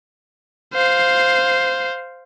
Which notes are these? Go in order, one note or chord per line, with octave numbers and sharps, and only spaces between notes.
C5 F5